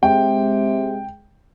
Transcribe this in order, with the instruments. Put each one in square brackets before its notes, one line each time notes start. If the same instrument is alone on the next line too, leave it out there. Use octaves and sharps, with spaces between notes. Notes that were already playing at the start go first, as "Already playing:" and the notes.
[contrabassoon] C3 [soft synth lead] G#3 [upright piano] G5